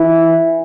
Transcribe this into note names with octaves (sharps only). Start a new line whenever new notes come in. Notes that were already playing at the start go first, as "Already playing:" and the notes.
Already playing: E3 E4